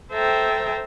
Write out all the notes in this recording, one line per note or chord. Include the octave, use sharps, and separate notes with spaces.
A4 C5 E5 G5 A#5